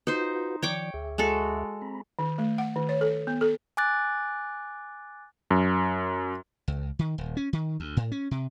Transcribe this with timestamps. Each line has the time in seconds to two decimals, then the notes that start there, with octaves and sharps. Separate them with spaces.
0.07 D#4 F4 F#4 B4 C5
0.62 D#3 F3 C#5 D5 G5 D6
0.94 D2 G#4 E5
1.18 G#3 F#4 A4
1.82 C4 A#5 B5
2.19 D#3
2.38 A3
2.58 F#5
2.76 D#3
2.89 C#5
3.01 A4
3.27 B3
3.41 A4
3.77 G#5 D6 F#6 A6
5.51 F#2
6.68 C#2
6.99 D#3
7.18 D#1
7.37 C#4
7.53 D#3
7.80 D2
7.97 A2
8.12 C#4
8.31 C3